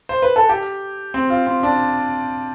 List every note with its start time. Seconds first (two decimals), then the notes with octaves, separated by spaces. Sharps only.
0.09 C5
0.22 B4
0.36 A4
0.49 G4
1.14 C4
1.30 F4
1.47 C4
1.63 D4